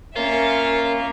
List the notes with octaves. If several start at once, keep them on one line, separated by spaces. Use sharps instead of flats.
A#3 C#4 F4 A#4 E5